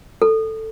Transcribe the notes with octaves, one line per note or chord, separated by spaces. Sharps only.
A4